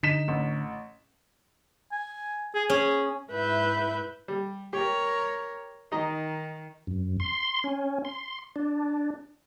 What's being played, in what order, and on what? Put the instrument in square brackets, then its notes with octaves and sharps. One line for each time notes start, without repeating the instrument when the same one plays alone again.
[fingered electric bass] D3 [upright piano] D#4 B6 E7
[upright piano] A1
[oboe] G#5
G#4
[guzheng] C#4 [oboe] G#4
[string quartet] G#2 E4 B4 E5 G6
[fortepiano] G3
[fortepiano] G4 [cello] A#4 C#5
[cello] D#3 [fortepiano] D#4 D#5 A#5
[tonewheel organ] F#2
C6
C#4
C6
D4